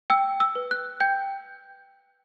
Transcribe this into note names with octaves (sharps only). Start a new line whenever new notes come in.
G5 E6
E6
B4
F#6
G5 G6